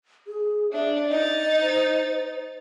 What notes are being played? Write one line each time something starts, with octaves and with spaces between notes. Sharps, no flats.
G#4
D4 E5
D#4 D#5 A6
C5